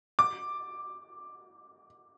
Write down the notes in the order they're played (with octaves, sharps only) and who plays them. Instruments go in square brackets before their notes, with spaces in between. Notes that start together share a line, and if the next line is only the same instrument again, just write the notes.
[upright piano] D6